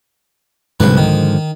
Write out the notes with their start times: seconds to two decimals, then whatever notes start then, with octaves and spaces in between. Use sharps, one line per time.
0.80 C2 G#2 D3 F3 B4
0.97 D#3